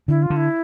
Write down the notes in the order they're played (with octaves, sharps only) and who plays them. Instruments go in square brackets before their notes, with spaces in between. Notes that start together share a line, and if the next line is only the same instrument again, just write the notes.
[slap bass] D3 [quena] E4
[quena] F4
[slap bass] D3
[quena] E4